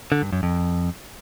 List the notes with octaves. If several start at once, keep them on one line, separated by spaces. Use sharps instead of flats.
D3
G2
F#2
F2